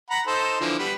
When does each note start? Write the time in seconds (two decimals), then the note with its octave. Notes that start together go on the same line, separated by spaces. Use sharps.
0.10 F#5 A#5 B5
0.27 D#4 A4 C5
0.61 D3 E3 F3
0.79 G3 B3 B4